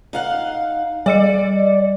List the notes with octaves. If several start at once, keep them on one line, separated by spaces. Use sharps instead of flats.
D#4 F5 F#5
G3 D5 D#5 C#7